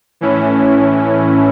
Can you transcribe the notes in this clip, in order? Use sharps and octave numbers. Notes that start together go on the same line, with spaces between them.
A2 E3 C#4 E4